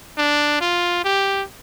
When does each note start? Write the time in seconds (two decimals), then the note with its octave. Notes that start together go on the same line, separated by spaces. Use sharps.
0.18 D4
0.61 F4
1.04 G4